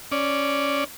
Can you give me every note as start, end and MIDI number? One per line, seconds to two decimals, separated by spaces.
0.12 0.84 61
0.12 0.84 74